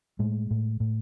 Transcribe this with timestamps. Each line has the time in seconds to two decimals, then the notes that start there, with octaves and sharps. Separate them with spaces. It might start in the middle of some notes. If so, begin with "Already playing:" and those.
0.19 A2 G#3
0.51 A2
0.80 A2